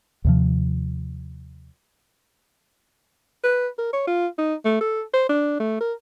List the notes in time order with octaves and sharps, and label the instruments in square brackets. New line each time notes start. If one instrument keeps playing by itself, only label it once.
[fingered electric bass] D#2 C3 F3
[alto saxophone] B4
A#4
C#5
F4
D#4
A3
A4
C5
D4
A3
A#4